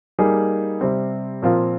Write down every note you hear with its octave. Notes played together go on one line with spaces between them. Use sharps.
G3 A#3 D#4 G#4
C3 G3 C4
A#2 F3 C4 F4 A#4